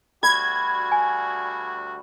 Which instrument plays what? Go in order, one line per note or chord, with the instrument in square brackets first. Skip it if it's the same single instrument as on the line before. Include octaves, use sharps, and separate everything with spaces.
[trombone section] D2 G3 F#4 [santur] B5 [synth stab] G#6
[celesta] G#5